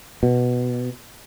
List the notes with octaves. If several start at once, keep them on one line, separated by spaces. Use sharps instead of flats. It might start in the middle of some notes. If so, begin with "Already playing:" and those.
B2